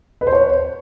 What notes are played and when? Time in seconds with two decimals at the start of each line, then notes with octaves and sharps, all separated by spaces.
0.21 B4
0.27 C5
0.33 C#5